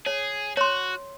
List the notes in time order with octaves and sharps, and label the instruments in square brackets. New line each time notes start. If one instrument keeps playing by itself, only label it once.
[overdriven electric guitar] G#4 [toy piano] C#5
[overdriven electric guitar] F#4 [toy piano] C#5 C6